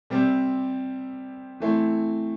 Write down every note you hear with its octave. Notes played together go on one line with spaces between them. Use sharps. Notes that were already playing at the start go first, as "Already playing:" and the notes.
C3 G3 C4
E3 A3 C4 E4